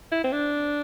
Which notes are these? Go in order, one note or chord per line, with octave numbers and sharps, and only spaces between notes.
E4
C4
D4